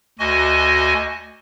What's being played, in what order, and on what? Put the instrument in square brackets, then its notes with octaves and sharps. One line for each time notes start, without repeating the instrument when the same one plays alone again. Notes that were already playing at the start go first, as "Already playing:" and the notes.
[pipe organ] D2 F#4 D#5 G#5